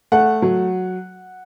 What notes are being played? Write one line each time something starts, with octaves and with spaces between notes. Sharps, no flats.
A3 F#5
F#3